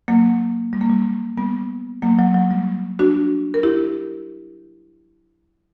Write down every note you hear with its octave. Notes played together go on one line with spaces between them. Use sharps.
F#3 A#3
G3
A#3
G3
G3 B3
F#3 A#3
F#3
F#3
G3
D4 F#4
A#4
E4 G4